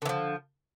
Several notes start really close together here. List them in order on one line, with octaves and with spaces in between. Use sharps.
D3 E3 F3